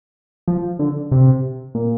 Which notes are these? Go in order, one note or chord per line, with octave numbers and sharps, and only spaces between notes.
F3
D3
C3
A#2